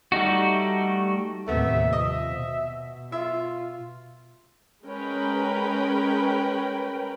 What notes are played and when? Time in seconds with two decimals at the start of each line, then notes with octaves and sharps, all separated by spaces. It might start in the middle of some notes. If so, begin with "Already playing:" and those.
0.12 G3 A3 D#4 F#4
1.48 D#2 A2 C3 A3 B3 E5
1.93 F3 D#5 E5
2.36 B2
3.12 F4 E5
4.86 G#3 C#4 A#4 B4 G5 B5